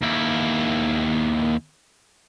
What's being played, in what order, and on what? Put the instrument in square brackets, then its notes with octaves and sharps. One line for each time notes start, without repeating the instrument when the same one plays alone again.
[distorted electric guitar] D#2 E4